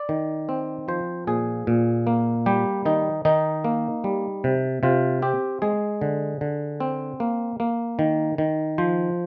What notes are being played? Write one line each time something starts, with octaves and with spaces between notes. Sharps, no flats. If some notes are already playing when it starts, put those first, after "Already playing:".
Already playing: D5
D#3
C4
F3 C5
A#2 G#4
A#2
A#3
G3 G4
D#3 D#4
D#3 D#4
A#3
G3
C3
C3 F4
C4 G4
G#3 G#4
D3
D3
C4
A#3
A#3
D#3
D#3
F3 C5